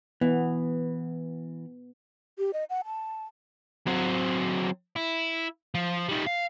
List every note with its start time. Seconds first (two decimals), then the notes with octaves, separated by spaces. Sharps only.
0.21 E3 B3
2.38 G4
2.53 D#5
2.70 F#5
2.85 A5
3.87 F#3 C4
4.96 E4
5.75 F3
6.09 D#3 G3
6.26 F5